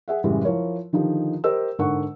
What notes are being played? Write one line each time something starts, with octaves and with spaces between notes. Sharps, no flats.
G#4 E5 F#5
A1 F#2 C#3 E3 G3 G#3
F3 E4 A#4 C#5
D3 D#3 F3 D#4 G4
G4 A#4 C5 D#5 E6
G#2 D3 A#4 F#5 C#6